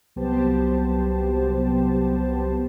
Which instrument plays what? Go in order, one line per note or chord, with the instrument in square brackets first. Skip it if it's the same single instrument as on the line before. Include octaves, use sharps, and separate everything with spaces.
[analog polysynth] C2 F#3 B3 G4 C5 A5